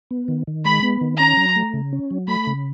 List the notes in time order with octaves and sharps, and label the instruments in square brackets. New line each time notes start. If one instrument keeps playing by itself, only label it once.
[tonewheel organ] B3
D#3
D#3
[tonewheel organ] G#3 [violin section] B5
[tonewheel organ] B3
D#3
[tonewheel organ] C#4 [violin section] A#5
[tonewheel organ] F#3
A3
C#3
C#4
F#3
[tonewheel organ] A3 [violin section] B5
[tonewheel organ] C#3